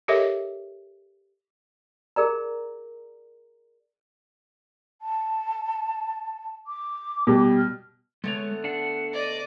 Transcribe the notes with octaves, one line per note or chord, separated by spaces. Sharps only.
G4 A4 A#4 C#5 D#5 E5
G#4 A#4 D5 A#5
A5
D6
B2 G3
F6
D3 G#3 A3 B3 C#5
D4 F#5
D5 D#5